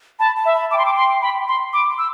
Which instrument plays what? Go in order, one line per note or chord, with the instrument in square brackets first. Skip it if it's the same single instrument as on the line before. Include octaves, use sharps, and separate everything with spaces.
[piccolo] A5 [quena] B5
[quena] A5
[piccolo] E5
[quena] B5
[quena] A5 [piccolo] D6
[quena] G5 [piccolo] C6
[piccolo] D6
C6
B5
C6
[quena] B5 [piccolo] D6
[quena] C6
[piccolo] E6